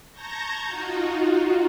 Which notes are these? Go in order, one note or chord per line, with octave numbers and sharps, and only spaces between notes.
A5 A#5 C#6 G6 G#6 A#6
D#4 F4 F#4